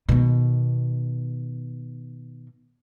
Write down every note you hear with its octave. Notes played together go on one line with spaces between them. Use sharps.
B2 D#3